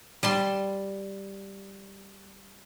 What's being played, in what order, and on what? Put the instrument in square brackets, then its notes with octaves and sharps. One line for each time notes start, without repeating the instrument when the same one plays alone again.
[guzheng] G3 A5 C6